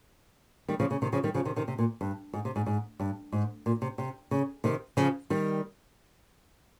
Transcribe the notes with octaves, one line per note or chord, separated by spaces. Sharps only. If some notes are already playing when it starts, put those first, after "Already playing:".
D#3 G3
C#3 F3
C#3
C3 D#3
C#3 F3
D#3 G3
C#3 F3
C3 D#3
C3 D#3
C3
A#2
G2
G#2
C3
G#2
G#2
G2
G#2
A#2
C3
C3
C#3
C3 D#3
C#3 F3
D#3 G3